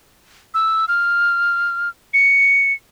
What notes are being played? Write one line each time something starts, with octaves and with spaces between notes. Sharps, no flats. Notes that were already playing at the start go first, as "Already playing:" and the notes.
E6
F6
C#7